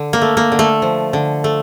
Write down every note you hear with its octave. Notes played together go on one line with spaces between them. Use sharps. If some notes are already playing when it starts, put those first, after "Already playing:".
Already playing: D3
A#3
A3
A#3
D3
A3
F3
D3
A3